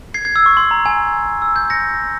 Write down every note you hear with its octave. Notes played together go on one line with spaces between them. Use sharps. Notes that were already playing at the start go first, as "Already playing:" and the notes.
G#6 C7
G#6 C7
E6
C#6
C6
A#5
G#5
E6
G6
A#6 C#7